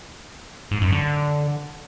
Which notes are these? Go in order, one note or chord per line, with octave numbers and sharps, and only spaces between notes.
G#2
F#2
D3